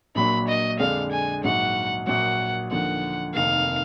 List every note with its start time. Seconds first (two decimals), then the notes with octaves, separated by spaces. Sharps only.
0.15 A#1 A#2 F#3 D4 B5
0.48 D#5
0.79 F2 D3 G#3 D4 F5
1.11 G#5
1.44 A#1 G#2 F#3 F#5
2.07 A#1 A#2 F#3 F#5
2.71 D#2 D3 F3 F#5
3.34 F1 F2 D#3 A#3 F5